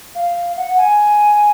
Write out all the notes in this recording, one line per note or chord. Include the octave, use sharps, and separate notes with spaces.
F5
F#5
G#5